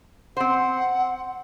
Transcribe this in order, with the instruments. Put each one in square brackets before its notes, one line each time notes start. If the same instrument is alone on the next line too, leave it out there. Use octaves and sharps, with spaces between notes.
[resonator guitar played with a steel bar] C4 C5 [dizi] F#5